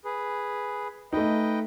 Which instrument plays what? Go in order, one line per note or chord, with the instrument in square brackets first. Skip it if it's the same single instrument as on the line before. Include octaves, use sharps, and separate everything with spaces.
[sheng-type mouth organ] G#4 B4
[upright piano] A3 D#4 [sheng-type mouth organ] B4 D#5 G5